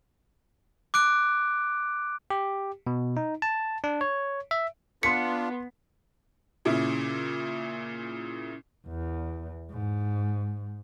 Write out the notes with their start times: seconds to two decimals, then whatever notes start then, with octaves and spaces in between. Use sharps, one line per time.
0.94 D6 F#6 D7
2.30 G4
2.87 B2
3.17 D#4
3.42 A5
3.84 D4
4.01 C#5
4.51 E5
5.03 B3 D4 F4 C6 B6 C#7
6.65 A#2 C#3 E4
8.87 E2
9.71 G#2